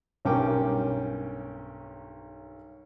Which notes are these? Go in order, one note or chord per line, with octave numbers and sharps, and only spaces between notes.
B1 G2 C#4 A#4 G5 D6